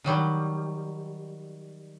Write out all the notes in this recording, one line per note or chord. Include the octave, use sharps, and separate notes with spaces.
D#3 F#3 G3